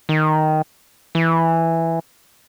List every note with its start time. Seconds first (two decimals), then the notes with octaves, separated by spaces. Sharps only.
0.09 D#3
1.15 E3